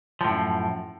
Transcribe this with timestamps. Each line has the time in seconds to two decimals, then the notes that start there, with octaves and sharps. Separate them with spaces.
0.21 F3
0.24 A2
0.28 F#2